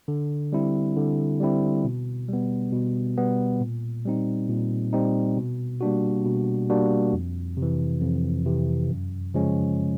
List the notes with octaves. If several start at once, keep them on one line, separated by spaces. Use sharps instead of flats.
D3
G3 C4 E4
D3
G3 C4 E4
B2
G3
B3
B2
G3 B3
A#2
G3 C4 D#4
A#2
G3 C4 D#4
B2
G3 A#3 D4 F#4
B2
G3 A#3 D4 F#4
F2
C3
E3
F2
C3 E3
F#2
C#3 F3 G#3 C#4